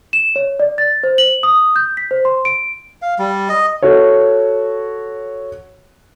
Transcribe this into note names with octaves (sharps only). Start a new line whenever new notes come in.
E7
C#5
D5
A6
C5
F#7
D#6
G6
B6
C5
C6
D7
F5
G3
D#5
F#4 A4 C#5